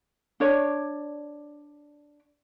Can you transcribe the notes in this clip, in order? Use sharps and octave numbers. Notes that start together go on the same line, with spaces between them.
D4 C#5 D5